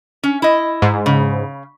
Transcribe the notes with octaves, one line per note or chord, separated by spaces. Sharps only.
C#4
E4 D#5
G#2
C#3